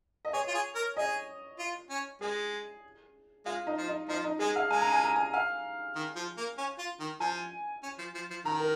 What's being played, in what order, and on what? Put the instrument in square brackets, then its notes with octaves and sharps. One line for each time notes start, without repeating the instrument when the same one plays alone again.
[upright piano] D#5
[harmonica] G#4 [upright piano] C#5
[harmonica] F4
G#4
A#4
[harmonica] G#4 [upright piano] D#5
[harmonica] F4
C#4
[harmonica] G#3 [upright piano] G#4
[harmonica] G#3 [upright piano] F4
[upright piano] D#4
[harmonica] F3
[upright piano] D#4
[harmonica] F3 [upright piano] D#4
[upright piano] D#4
[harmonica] G#3 [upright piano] G#4
[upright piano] F5
[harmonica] G#3 [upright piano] G#5
[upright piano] A#5
G#5
A#5
G#5
F5
[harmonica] D#3
F3
A#3
C#4
F4
D#3
[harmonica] F3 [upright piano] G#5
[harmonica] C#4
F3
F3
F3
[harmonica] D#3 [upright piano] A#5
[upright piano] A#4